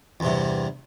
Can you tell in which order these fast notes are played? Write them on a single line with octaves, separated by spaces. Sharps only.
E2 C3 G2